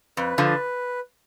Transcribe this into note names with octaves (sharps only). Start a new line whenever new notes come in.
F2 B4
D3 F3